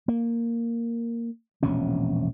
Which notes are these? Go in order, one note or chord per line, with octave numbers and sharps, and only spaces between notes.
A#3
E1 A#1 C3 C#4